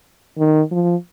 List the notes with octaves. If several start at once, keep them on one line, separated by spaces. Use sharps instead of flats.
D#3
F3